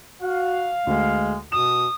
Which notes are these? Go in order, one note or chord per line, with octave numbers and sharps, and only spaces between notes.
F#4 F5
D2 G#3
B2 D#6 E7